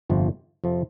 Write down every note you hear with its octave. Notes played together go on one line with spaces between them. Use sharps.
G1 F2 C3 F3
F2 C3 F3